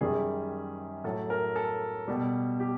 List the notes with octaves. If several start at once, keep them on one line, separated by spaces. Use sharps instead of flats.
F#2 D#3 G3 G#4
A2 F#3 A4
A#4
A4
B2 G3
G4